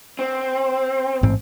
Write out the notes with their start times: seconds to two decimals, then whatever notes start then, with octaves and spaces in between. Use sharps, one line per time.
0.19 C4
1.23 A1 G#2 C4